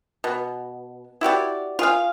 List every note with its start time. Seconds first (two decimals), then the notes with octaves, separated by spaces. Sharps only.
0.24 B2
1.21 E4 F#4 G4 D5
1.79 F4 G#4 F5